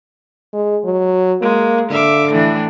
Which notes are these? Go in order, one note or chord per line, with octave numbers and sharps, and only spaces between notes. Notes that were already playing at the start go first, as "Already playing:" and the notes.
G#3
F#3
G#3 A#3
D3 E5 F5 D6
A2 E3 D4